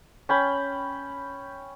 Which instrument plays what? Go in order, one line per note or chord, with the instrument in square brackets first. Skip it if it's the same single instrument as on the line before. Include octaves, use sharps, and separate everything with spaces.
[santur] C#4 G5 B5